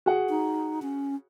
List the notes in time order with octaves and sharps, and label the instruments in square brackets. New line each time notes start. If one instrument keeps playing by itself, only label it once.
[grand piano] F#4 G#4 F#5
[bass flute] D#4
C#4